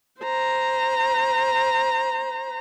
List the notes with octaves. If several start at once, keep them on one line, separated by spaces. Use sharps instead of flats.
C5 A#5